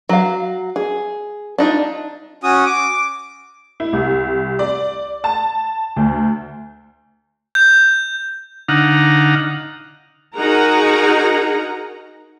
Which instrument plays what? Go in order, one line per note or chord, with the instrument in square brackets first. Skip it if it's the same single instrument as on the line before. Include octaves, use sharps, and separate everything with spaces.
[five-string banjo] F#3 F5
G#4
D4 D#4 F4
[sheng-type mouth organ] C#4 F#4 D#6
D6
[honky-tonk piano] E4
C2
D5
A5
D2
[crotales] G6
[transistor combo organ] D3 D#4 F5 F#5 A#5
[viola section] D#4 F#4 G#4 A#4 F#5 A#5